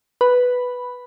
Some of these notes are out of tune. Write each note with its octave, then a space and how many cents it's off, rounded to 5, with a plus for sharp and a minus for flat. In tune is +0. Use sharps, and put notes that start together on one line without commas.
B4 +0 B5 +0